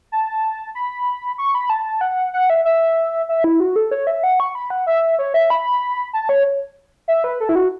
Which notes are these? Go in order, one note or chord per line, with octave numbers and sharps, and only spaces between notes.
A5
B5
C#6
B5
A5
F#5
F#5
E5
E5
E5
E4
F#4
A4
C#5
E5
F#5
C#6
B5
F#5
E5
C#5
E5
B5
A5
C#5
E5
B4
A4
E4
F#4